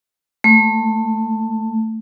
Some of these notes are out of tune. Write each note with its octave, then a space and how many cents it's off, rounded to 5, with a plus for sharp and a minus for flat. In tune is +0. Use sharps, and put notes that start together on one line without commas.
A3 +15